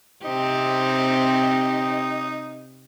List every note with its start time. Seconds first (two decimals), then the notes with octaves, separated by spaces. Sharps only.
0.25 C3 C4 D#4 G4